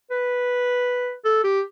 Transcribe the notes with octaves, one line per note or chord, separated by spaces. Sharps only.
B4
A4
G4